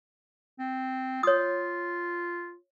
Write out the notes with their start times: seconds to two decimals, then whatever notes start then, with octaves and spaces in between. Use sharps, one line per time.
0.59 C4
1.23 F4 C#5 D#6